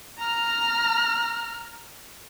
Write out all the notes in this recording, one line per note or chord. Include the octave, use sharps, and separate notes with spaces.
A#5 F6